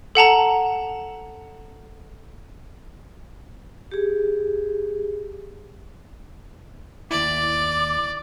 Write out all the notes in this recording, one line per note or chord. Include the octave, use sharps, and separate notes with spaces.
A4 F#5 A5 A#5
G4 G#4
D#2 E4 D5 D6